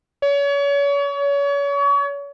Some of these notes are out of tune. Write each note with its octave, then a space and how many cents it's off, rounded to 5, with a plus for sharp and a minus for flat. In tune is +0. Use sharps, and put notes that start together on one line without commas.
C#5 +35